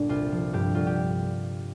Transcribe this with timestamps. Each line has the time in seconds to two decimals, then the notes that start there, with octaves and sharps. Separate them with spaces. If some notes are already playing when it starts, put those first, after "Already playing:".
Already playing: G1 A#2 D4
0.09 C2 F4
0.32 F3
0.53 G2 G4
0.75 G1 F4
0.86 G4